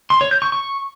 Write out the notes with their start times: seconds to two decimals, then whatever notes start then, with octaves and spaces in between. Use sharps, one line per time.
0.10 C6
0.21 C#5
0.31 G6
0.42 C#6
0.52 C#6